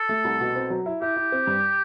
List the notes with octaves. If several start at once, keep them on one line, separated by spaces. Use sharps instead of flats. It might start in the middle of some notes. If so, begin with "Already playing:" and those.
Already playing: A4
A3
C2
B2
C4
F#3
E4
E4 G4
E4
C4
G2